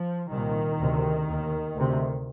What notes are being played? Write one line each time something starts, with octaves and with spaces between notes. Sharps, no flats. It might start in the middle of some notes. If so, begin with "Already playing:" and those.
Already playing: F3
C2 A#2 D#3
D2 C3
D#2
D2 C3